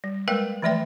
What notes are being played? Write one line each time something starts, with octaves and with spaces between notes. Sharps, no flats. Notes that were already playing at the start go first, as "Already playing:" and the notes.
G3
G#3 A#3 A#4 B4 F5 G5
E3 F3 A3 D5 E5 G5